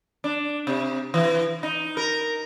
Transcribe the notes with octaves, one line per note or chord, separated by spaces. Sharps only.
D4
C3
E3
D#4
A#4